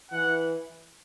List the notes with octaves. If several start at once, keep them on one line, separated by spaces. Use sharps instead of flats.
E3 F#5